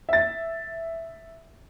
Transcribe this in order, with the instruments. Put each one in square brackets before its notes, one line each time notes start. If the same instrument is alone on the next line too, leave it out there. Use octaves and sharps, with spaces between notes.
[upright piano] E5 A6